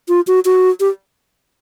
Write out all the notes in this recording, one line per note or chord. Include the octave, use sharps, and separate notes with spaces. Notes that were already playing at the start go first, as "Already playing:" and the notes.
F4
F#4
F#4
G4